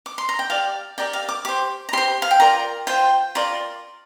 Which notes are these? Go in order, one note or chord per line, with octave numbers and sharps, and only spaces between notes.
D6
C6
A#5
G5
G4 D5 F5
G4 A#4 D5 G5
F5
D6
G4 C5 D6
A#5
G4 C5 C6
F5
G5
F4 A#4 D5 A#5
F4 C5 G5
F4 A#4 D5